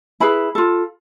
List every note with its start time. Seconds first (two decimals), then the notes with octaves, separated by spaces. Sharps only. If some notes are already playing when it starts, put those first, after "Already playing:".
0.20 E4 G#4 B4 B5
0.55 F4 A4